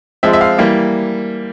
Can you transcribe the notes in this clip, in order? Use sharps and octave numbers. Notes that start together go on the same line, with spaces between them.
F3 G#3 C4 E5
E5
F5
E3 G3 A#3